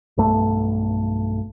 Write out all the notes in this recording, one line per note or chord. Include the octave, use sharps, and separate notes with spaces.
B1 G2 A3